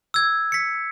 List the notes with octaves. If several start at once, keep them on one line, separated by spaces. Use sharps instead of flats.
E6 G#6
B6 C#7